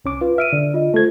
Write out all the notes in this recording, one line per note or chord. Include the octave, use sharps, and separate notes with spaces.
C2 C#4 D6
F4 B4
E5 F6 D7 D#7
D3 D5
F4 D#5
A3 F4 A4 C5 G#6